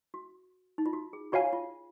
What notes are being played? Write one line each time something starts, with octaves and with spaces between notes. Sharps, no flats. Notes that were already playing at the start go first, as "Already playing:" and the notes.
F#4
D#4
F4
F#4
G#4
F4 F#4 C#5 F5 G#5
F4